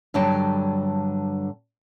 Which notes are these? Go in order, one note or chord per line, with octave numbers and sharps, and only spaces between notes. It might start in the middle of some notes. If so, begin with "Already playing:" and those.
G2 D3 F#3 G3 G5 A5